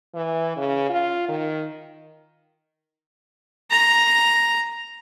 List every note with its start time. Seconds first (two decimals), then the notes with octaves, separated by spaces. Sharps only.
0.14 E3
0.56 C#3
0.90 F4
1.28 D#3
3.71 A#5